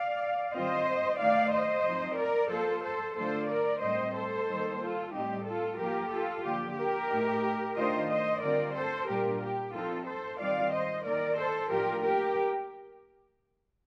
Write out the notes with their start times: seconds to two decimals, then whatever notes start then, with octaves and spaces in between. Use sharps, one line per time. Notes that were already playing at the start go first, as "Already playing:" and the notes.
Already playing: D5 F5
0.53 D#3 G3 C4 F4 C5 D#5
1.19 D#3 A3 D#4 D5 F5
1.53 C5 D#5
1.85 F3 C4 D#4
2.17 A#4 D5
2.50 F3 A#3 F4 A4 C5
2.83 A4 C5
3.17 D3 F3 A3 D4 F4 A4 C5
3.49 A#4 D5
3.82 A2 G3 C4 C5 D#5
4.14 A4 C5
4.48 D#3 G3 A#3 D#4
4.80 F4 A4
5.14 A2 G3 C4 D#4 G4
5.47 F4 A4
5.79 F3 A#3 F4 G4 A#4
6.11 F4 A4
6.44 D3 F3 A#3 G4
6.77 G4 A#4
7.10 A2 A3 D#4
7.76 D#3 A3 D4 F4 C5 D#5
8.09 C5 D#5
8.41 D3 G3 C4 F4 A#4 D5
8.75 A4 C5
9.08 A#2 G3 D4 F4 G4 A#4
9.41 G4
9.73 F3 C4 D#4 F4 A4
10.06 A4 C5
10.38 D#3 G3 C4 F4 D5 F5
10.72 C5 D#5
11.04 D#3 A#3 D#4 A#4 D5
11.37 A4 C5
11.70 A2 F3 A#3 D4 F4 G4 A#4
12.02 G4 A#4